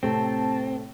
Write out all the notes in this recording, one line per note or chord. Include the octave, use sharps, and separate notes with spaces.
A2 C3 A3 C4 A5